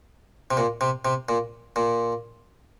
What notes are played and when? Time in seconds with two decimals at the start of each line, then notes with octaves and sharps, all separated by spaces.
0.51 C3
0.57 A#2
0.81 C3
1.05 C3
1.29 A#2
1.76 A#2